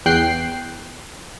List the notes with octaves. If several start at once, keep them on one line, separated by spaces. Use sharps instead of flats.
E2 G5 F#6 C7